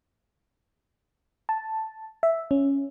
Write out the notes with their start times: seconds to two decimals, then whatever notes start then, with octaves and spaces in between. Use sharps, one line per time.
1.49 A5
2.23 E5
2.51 C#4